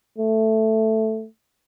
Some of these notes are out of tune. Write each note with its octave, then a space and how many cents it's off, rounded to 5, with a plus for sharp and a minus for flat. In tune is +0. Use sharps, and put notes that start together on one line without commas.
A3 +5